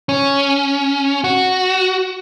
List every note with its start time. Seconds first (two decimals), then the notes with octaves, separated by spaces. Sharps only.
0.09 C#4
1.24 F#4